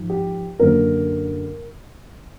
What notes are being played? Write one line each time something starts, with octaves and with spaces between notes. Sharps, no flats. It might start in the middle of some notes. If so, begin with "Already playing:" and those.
Already playing: G#2 F3
G4
F#2 D3 F#3 A#3 A#4